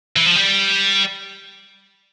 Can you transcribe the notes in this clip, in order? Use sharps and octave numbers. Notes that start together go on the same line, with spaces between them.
E3
F3
G3